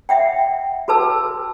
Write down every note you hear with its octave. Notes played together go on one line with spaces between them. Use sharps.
E5 F#5 G5
F#4 A4 B4 A5 E6